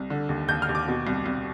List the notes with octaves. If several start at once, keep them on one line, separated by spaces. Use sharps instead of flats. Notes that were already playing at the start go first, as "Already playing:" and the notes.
Already playing: C2
D3
D#2
D#2 G6
F6
D#2
D6
B2
C2
C2